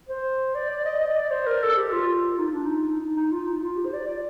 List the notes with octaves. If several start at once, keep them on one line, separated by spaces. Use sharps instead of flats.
C5
D5
D5
D#5
D#5
D5
C5
A#4
A4
G4
F4
D#4
D4
D#4
D#4
D#4
F4
D#4
F4
G4
C5
D5
D5